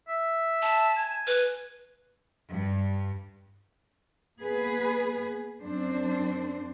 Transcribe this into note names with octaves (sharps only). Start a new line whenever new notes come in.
E5
A5
G#5
B4
G2
A#3 B3 G#4 B4
F#2 C4 D4 C5